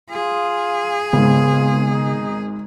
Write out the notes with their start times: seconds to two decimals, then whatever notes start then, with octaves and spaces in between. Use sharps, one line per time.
0.10 F4 G#4
1.13 G#1 G#2 C#3 B3 F4
1.90 D#4